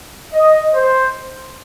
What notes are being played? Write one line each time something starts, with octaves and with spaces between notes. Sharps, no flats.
D#5
C5